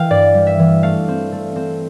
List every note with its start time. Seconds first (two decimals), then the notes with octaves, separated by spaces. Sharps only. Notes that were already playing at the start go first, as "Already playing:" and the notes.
Already playing: E3 F5 G5
0.10 G2 D5
0.34 G3
0.47 E5
0.59 E3
0.83 A3 F5
1.08 C4
1.32 A3
1.56 C4